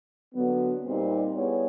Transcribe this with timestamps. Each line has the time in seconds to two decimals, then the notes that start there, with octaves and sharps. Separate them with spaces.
0.34 D3 F#3 B3
0.84 A#2 G3 C4 D#4 G4
1.34 G3 B3 E4 G#4 C#5